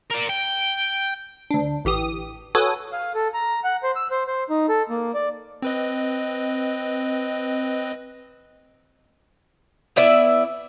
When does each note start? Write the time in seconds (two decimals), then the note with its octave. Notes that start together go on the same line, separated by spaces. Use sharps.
0.11 A#4 D5
0.30 G5
1.51 D2 D4
1.85 A1 E3 G4 D#6
2.55 F#4 A4 B4 C#5 G#5 D#6
2.92 F5
3.15 A4
3.34 A#5
3.64 F#5
3.83 C5
3.96 E6
4.11 C5
4.27 C5
4.50 D#4
4.69 A4
4.90 A#3
5.14 D5
5.62 C4 B4 D#5
9.96 B3 E4 D5 E5